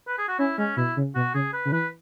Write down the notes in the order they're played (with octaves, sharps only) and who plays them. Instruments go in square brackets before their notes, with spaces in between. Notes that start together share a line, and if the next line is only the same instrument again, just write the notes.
[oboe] B4
G#4
F#4
[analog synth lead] C#4 [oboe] E4
[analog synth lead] G#3 [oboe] C#4
[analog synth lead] B2 [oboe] E4
[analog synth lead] C#3
[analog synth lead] B2 [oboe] F#4
[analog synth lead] C#3 [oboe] G#4
[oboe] B4
[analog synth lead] C#3
[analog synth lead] E3 [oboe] B4